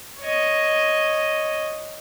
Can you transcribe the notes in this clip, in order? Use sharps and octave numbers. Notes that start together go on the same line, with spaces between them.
C#5 D#5